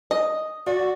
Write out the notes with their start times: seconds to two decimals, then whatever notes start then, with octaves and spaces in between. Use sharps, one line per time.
0.11 D#5
0.67 F#4 D5